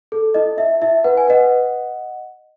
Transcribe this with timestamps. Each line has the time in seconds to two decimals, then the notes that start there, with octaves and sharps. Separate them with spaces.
0.12 A4
0.34 E4 D#5
0.58 E4 E5
0.82 E4 E5
1.04 B4 F#5
1.17 G#5
1.28 B4 D#5 F#5